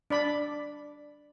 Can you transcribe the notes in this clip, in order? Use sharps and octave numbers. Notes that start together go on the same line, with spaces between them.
D4 D5 B5